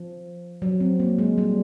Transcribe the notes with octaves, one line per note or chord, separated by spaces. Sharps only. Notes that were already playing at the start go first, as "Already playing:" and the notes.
Already playing: F3
F#3
C4
A#3
G#3
G3